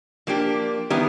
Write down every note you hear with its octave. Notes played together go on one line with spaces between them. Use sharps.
F3 A#3 D4 G4
D#3 G3 B3 E4 G#4